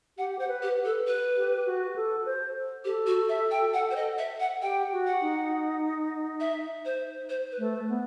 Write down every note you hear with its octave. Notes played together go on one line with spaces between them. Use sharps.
G4 F#5
C5 F#5
B4
G4
B4
A4
B4
G4
F#4
A4
C5
G4 A4
F#4
E5
G5
F#5
C5
D#5
E5
F#5
G4 G5
F#4
F#5
D#4
E5
C5
C5
B4
A3
B3